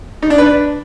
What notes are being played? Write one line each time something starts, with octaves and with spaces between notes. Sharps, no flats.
D#4
D4
B4
D4